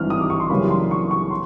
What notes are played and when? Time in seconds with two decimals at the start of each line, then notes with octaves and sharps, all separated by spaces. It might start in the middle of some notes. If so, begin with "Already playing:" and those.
Already playing: G#1 G2 E3 F6
0.10 D#6
0.20 D6
0.30 C#6
0.40 C6
0.50 F#2 C#3 E3 G3 A#3 B5
0.70 C6
0.91 C#6
1.11 C#6
1.31 C6